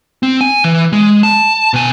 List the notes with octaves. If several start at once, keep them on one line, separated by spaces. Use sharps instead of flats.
C4
G#5
E3
G#3
A5
B2 G#5